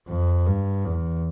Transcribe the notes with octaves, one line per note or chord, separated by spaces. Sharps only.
F2
G2
E2